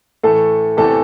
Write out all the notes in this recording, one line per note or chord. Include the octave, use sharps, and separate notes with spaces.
A2 E3 A3 A4
E2 C3 E3 A3 A4